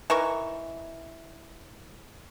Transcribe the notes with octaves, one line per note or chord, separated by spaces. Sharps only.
E3 D#4 A#4 C#6